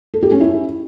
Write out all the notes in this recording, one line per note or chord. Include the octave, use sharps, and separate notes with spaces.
A4
G4
C#4
E4